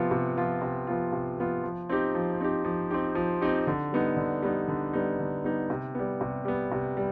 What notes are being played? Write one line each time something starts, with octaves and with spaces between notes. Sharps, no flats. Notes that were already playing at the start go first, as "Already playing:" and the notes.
Already playing: C3 F3 B3 F4
C3
F3 B3 F4
C3
F3 B3 F4
C3
F3 B3 F4
F3
C4 D#4 G4
F3
C4 D#4 G4
F3
C4 D#4 G4
F3
C4 D#4 G4
D3
G3 B3 D#4
D3
G3 B3 D#4
D3
G3 B3 D#4
D3
G3 B3 D#4
C3
G3 B3
C3
G3 B3
C3
G3